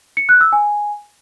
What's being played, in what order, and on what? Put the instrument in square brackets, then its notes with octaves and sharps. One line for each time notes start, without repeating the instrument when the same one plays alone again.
[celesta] C#7
F#6
E6
G#5